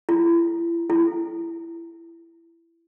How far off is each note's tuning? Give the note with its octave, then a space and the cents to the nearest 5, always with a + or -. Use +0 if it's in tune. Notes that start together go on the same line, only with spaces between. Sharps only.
E4 +35
E4 +20